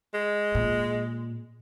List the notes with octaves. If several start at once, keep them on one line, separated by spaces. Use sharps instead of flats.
G#3
A#2